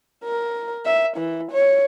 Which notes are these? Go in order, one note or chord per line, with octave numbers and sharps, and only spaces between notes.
A#4
E5
E3
C#5